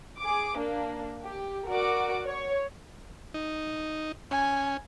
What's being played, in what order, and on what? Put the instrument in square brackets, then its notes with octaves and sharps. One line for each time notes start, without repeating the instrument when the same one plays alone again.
[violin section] G#4 D6
A#3 D4
G4
F#4 A#4 D5 F#5 D6
C#5
[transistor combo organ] D#4
[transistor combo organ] C#4 [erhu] G#5